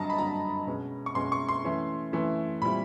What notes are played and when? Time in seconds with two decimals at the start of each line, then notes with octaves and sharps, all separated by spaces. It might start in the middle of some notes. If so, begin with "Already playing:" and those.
Already playing: G2 D3 F#3 D#5 A5 A#5
0.10 B5
0.18 G2 D3 F#3 A#5
0.67 B2 G#3 C#4
1.06 C#6
1.15 B2 G#3 C#4 C6
1.32 C#6
1.49 C6
1.64 E3 A3 C#4 E4
2.13 E3 A3 C#4 E4
2.62 A#2 G3 C4 E4 B5